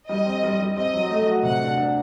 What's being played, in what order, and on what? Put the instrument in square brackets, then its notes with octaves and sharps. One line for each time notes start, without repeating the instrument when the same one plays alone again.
[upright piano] G3 [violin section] D#5
[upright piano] C4
G3
G3
[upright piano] C4 [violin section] D#5
[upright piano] F#3
A3
F#4
[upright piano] C3 [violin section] F#5
[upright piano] D4
D4